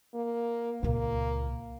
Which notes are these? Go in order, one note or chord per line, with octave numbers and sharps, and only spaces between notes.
A#3
C#2 A#2 A#3